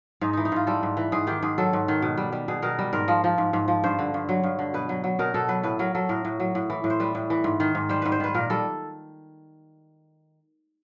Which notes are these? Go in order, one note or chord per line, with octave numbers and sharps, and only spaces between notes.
G#2 D#4
E3 D#4
D#4
G#2 F4
G3 A4
G#2
E3
G#2 G#4
D#3 G4
G#2 G#4
F#3 A4
G#2
D#3
B2
G3
G3
B2 G#4
B2 A#4
G3
G#2 A#4
F3
F3
G#2
G#2
F3
G2 C5
D3
G2
F#3
G2
D3
B2 B4
F#3
F#3
B2 A#4
B2 A4
F#3 B4
A2 B4
F#3 A#4
F#3 A4
A2 A#4
A2
F#3
A2
E3
A2
C5
G3 B4
A2
E3
G#2
D#3
G#2
G3 C5
G#2 B4
C5
D#3 B4
A#2 A#4
G3 A4